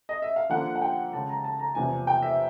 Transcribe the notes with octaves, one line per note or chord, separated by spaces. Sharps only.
D#5
E5
F5
D3 F3 A#3 F#5
F#5
G5
C#3 E3 G#3 A5
A#5
A5
A#5
E2 C3 F3 A#3 G#5
G5
E5